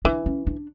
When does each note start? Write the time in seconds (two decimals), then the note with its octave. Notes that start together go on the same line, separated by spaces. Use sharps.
0.05 E3 D4
0.26 C#4
0.47 D4